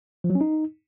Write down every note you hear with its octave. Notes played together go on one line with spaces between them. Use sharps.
F3
F#3
C#4
D#4